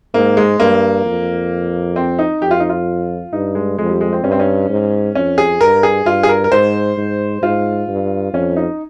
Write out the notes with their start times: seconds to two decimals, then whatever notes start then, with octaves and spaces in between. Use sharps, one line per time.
0.14 G#2 A#3
0.37 G#3
0.60 G2 A#3
1.05 F2
1.96 C4
2.19 D#4
2.42 F2 G4
2.51 F4
2.60 D#4
2.69 F4
3.33 G2 D#4
3.55 G#3
3.79 F2 G#3
3.89 G3
4.01 G#3
4.13 C4
4.24 G2 C#4
4.32 C4
4.40 C#4
4.69 G#2
5.15 F2 C#4
5.38 G#4
5.61 G2 A#4
5.83 G#4
6.05 G2 F4
6.23 G#4
6.29 A#4
6.44 A#4
6.51 G#2 C5
6.97 G#2
7.42 G#2 F4
7.88 G2
8.34 F2 C#4
8.56 D#4